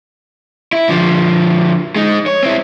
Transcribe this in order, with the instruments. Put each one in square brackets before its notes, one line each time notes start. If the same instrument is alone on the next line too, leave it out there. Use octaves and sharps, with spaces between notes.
[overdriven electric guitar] E4
D3 F3
G#3 D#4
C#5
C4 E4